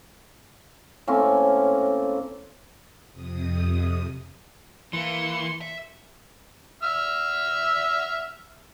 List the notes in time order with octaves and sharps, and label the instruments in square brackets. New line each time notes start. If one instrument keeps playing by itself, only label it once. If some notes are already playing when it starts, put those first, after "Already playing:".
[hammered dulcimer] A2 A#3 C4 C#4
[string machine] F2 C3 D#6
[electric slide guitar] E3 [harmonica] A#3 [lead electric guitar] C6 [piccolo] C#7
[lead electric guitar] E5
[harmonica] E5 E6 F6